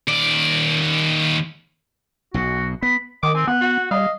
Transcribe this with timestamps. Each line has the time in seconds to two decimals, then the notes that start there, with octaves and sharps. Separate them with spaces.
0.08 D#2 D5
2.34 B1 B2 F#4
2.82 B3 B5
3.23 D#3 D#5 D6
3.35 C4 G#5
3.48 B3 F#5
3.61 F#4
3.91 G3 D#5 F5